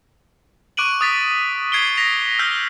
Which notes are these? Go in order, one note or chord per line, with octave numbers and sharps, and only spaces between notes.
C#6 D6 F#6 D7 D#7 F#7
D#6 A6 B6
D#6 G#6 C7 D7 G7
A#6 B6 F7
E6 F6 G6 A#6